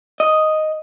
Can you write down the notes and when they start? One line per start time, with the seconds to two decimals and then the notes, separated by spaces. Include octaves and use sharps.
0.20 D#5